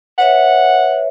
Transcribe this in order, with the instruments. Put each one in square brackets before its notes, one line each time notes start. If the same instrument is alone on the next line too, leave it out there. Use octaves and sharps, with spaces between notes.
[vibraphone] B4 C#5 E5 [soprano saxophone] F#5